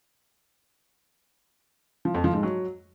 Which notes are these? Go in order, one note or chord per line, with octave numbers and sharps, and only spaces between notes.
F3
F2
F3
G#2
F#3